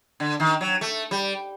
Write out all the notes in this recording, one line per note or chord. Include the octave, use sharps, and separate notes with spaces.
D3
D#3
F#3
A3
G3